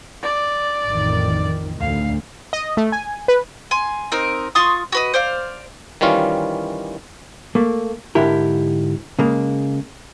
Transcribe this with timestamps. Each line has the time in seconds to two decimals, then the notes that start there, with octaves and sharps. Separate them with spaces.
0.23 D5
0.87 A1 F2 D#3
1.80 D2 F5
2.53 D#5
2.77 A3
2.92 G#5
3.28 B4
3.71 G#5 C6
4.12 C4 D#4 A#4
4.55 F4 C6 C#6 D#6
4.92 F#4 B4 D#5
5.14 C5 D5 F5
6.01 D#3 E3 G3 C#4 F4
7.55 A3 A#3
8.15 G#2 D3 E4 G4 A#4
9.19 C#3 G#3 A#3